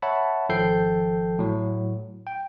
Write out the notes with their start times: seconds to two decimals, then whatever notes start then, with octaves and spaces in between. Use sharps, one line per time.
0.02 C#5 E5 F#5 A5 B5
0.49 G#1 F3 A4 G5 G6 C7
1.39 A2 F#3
2.27 G5